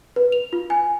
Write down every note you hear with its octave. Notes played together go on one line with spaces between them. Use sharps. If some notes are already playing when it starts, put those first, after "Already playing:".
B4
F7
F4
G#5